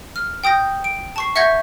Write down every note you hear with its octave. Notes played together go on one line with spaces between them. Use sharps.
F6
G5 D#6 G6 A#6
D7
A5 C#6 C7
E5 F#5 C#6 G6 G#6 A#6